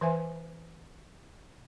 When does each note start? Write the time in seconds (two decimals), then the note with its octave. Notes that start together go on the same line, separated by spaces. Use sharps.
0.01 E3 B4 C5 E5 G#5